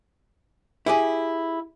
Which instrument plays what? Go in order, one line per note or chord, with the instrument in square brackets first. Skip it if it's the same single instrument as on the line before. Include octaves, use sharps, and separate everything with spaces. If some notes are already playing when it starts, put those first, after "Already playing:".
[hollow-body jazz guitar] E4 G4 G#4